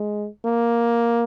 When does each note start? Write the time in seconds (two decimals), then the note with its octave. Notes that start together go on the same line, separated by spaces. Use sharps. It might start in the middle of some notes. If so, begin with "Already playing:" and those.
Already playing: G#3
0.45 A#3